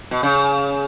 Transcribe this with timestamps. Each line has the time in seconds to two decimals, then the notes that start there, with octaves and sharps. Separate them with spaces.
0.11 B2
0.23 C#3